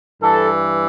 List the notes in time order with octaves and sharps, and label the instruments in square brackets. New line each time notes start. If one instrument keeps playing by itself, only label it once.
[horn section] G2 E3 A4